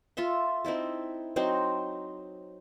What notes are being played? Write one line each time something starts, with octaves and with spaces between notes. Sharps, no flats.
F4 A4 E5 C6
C4 D#4 E4 A4
F#3 C4 D#4 C5